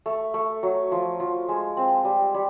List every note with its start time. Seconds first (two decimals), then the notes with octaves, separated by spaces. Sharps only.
0.06 A3
0.34 A3
0.63 F#3
0.92 F3
1.20 F3
1.49 G#3
1.77 C4
2.05 G3
2.34 G3